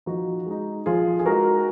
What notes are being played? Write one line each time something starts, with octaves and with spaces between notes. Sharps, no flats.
F3 D#4 F#4
G#3 D#4
F3 F4 G#4
G#4
G#3 D#4 F#4 A#4